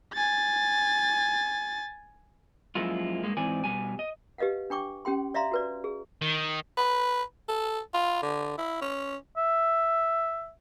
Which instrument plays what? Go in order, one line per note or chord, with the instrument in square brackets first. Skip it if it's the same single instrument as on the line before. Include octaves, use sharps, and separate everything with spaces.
[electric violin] G#5 A6
[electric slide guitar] F#2 F3 G#3 A#3 E4 F4
G2 G#3 A#3
G#2 E3 C4 D5 G#5
B2 G3 G#5
D#5
[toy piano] G4 B4 D#5 F5 F#5
D4 G5 C#6 D6
C#4 G4 G5 C6
D5 E5 F5 A#5 C6
F#4 B4 D5
G#4
[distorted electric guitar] D#3
[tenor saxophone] B4
A4
F4
D3
E4
C#4
[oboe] E5